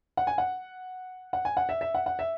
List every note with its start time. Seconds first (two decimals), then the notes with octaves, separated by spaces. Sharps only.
0.17 F#5
0.27 G#5
0.38 F#5
1.33 F#5
1.45 G#5
1.57 F#5
1.69 E5
1.81 E5
1.95 F#5
2.06 F#5
2.19 E5